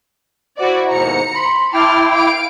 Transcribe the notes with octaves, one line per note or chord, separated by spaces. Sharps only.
E4 F#4 C5 D5
D#2 G#2 B2 A#5 C#7
B5 C6
E4 G5 A5 C6 D6 F6
F5 D7